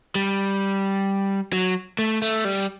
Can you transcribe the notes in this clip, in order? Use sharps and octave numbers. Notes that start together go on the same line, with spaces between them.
G3
F#3
A3
A3
G3